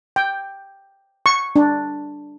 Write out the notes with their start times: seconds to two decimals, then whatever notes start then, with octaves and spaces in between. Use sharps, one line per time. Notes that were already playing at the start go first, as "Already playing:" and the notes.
0.16 G5
1.26 C#6
1.56 D4